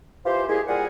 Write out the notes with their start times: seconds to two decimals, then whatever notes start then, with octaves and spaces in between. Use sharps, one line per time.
0.25 E3 F4 G4 C5
0.48 G#3 A#3 E4 G4 G#4
0.68 A#2 G3 G#4 A#4 F#5 G#5